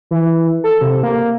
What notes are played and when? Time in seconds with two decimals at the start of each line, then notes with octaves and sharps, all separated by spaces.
0.11 E3
0.64 A4
0.81 C3
1.03 A#3